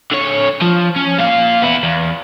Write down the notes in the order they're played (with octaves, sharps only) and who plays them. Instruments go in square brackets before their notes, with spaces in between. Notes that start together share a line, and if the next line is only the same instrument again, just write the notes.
[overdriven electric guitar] D3 C#5
F3
C#4
A#2 F5
B3 E4
E2